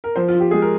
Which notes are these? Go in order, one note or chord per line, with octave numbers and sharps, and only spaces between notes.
A#4
F3 C5
F4
F3
G4
G#3 G#4
A#4